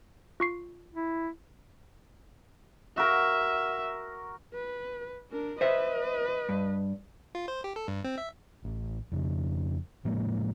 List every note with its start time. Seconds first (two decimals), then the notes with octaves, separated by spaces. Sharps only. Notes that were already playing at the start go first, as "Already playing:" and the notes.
0.40 F4 C#6 C7
0.94 E4
2.98 F#4 A#4 E5
4.54 B4
5.31 D4 A#4
5.61 B4 C5 D#5 E5
6.49 G2
7.35 F4
7.48 C5
7.64 G4
7.76 A4
7.88 G2
8.04 C4
8.18 E5
8.65 A1
9.12 F2 C#3
10.05 A2 F3 G#3 A#3